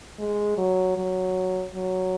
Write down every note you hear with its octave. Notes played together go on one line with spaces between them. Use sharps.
G#3
F#3
F#3
F#3